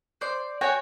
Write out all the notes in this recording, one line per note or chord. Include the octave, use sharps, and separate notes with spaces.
C5 D5
F#4 C#5 G5 G#5